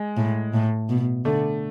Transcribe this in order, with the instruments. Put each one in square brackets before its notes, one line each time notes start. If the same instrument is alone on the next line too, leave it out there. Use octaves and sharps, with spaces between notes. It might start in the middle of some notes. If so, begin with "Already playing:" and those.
Already playing: [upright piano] G#3
[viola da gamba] A2
A2
B2
[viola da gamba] D3 [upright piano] A3